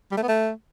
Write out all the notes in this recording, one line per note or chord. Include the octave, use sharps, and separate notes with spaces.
G3
A3
B3
A3